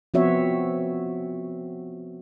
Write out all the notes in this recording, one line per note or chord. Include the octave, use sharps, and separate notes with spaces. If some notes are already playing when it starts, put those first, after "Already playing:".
F3 B3 C4 F#4 C#5 E5